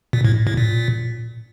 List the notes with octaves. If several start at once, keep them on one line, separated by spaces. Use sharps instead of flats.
A#2
A2
A2
A#2